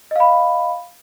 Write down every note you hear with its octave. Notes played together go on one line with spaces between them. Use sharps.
D#5 F5 B5